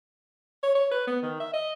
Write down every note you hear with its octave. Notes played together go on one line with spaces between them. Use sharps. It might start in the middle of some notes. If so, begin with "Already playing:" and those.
C#5
C#5
B4
B3
D#3
E5
D#5